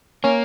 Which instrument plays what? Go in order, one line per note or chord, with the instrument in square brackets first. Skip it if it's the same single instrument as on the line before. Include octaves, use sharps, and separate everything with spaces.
[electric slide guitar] A#3 [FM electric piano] C#4